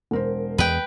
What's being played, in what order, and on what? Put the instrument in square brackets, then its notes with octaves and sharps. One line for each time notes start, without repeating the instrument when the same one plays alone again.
[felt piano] E1 A#4 C5
[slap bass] E2 G#3 [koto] B4 G5